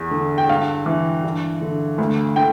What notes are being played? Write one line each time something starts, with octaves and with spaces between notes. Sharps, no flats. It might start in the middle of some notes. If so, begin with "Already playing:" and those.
Already playing: E2
D3
G5
G2 F5
E3
G2
D3
D2
D3 G5